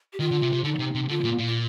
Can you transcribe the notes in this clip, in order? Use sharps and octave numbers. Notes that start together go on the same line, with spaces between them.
G4
D#3 F4
D3
C3
C3
D3 D#4
C3
C3
D3 F4
A#2
A#2
F4